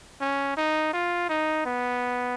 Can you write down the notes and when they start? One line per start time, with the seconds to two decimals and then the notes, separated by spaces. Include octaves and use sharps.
0.21 C#4
0.57 D#4
0.93 F4
1.29 D#4
1.65 B3